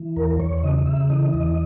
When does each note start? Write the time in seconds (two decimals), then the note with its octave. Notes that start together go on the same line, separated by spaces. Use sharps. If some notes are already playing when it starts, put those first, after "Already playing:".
Already playing: E3
0.16 E2 A#4
0.39 E2 C#5
0.58 C#5
0.63 C#3 D#5
0.86 C#3 E5
1.10 E3 D#5
1.33 E2 D#5